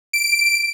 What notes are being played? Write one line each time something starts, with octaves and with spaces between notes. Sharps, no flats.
D7